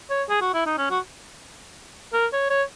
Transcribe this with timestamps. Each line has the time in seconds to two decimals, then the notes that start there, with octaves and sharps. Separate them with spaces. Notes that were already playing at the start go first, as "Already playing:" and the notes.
0.10 C#5
0.29 G#4
0.41 F#4
0.54 E4
0.66 D#4
0.78 C#4
0.90 F#4
2.13 A#4
2.33 C#5
2.50 C#5